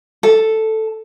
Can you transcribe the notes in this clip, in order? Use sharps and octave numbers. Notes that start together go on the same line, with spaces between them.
A4